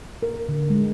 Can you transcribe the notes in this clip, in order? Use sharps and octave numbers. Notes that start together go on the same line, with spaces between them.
A#4
D3
G#3